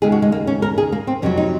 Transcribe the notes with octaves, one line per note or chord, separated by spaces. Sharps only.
D#2 C#3 G#3 G#4
F#4
G#3
A#3
C#4
A#4
G#4
A#3
C4
F2 C3 D#3 F#3 C#4
D#4